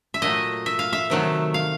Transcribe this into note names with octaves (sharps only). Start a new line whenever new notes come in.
E5
A#2 F#3 A3 D#5
E5
F5
E5
C3 D#3 F#3 A3
F5